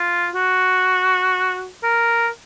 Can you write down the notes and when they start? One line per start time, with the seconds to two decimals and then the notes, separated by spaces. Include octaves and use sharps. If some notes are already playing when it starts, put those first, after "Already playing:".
Already playing: F4
0.34 F#4
1.83 A#4